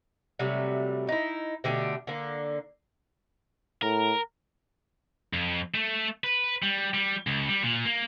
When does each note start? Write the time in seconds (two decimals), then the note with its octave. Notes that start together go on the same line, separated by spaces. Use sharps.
0.39 C3 F#3 G3 A3
1.08 D#4 E4
1.64 B2 D3 A3 G4
2.07 D3 A#3
3.82 A2 A#4
5.33 F2
5.74 A3
6.24 B4
6.63 G3
6.94 G3
7.27 C#2
7.49 G3
7.62 A#2
7.85 A#3